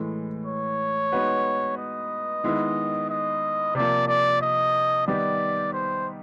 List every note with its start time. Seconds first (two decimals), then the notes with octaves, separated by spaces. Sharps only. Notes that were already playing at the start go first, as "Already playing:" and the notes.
Already playing: A2 E3 G#3
0.46 C#5
1.12 G#3 B3 D#4 F#4 B4
1.78 D#5
2.44 D#3 G#3 B3 E4
3.10 D#5
3.75 C3 F3 A#3 D5
4.08 D5
4.42 D#5
5.07 D#3 G3 B3 D#4 G4 D5
5.73 C5